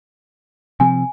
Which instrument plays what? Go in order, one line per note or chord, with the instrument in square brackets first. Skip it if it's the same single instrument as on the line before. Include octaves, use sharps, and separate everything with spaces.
[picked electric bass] C3 F3 C4 [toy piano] G#5